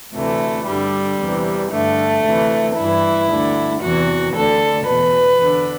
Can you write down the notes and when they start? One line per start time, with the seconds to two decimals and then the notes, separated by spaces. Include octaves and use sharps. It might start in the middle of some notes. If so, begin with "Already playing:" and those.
0.14 D2 C3 E3 A3
0.66 G2 D3 G3
1.19 E2 C3 E3
1.71 G2 D3 A3
2.24 D2 C3 E3
2.76 G2 E3 E4
3.29 D2 D3
3.81 E2 C3 E3 F#4
4.35 D2 D3 A4
4.87 E2 B2 B4
5.39 E2 D3